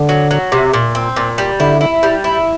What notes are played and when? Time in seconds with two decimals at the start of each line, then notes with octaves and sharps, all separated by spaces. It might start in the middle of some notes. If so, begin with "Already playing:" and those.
Already playing: D3
0.09 F#3
0.31 F#3
0.52 C3
0.74 A#2
0.95 C4
1.16 A#2
1.38 G3
1.60 D3 E4
1.81 E4
2.03 G3
2.24 E4